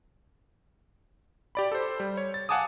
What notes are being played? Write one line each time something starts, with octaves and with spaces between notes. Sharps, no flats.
G4 D5 B5
A4 C5
G3
C#5
A6
F5 F#5 G#5 A5 D6 D#6